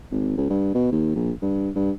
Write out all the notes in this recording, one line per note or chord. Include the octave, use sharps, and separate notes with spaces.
G#1
C#2
G2
B2
D#2
A#1
G2
G2